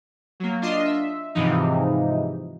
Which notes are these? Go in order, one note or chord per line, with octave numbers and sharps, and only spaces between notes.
F#3 A#3
D4 F4 D#5 C6
E5
G#2 C3 E3 F3 D#4